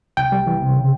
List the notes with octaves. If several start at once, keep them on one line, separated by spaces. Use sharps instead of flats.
C2 G5
G3
E3
C3
C#3